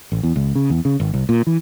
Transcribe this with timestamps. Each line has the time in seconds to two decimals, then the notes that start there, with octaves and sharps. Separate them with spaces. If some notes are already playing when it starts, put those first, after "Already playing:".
0.12 A1
0.23 E2
0.36 C#2
0.55 C#3
0.70 E2
0.85 C#3
1.00 G#1
1.14 C2
1.29 A#2
1.47 E3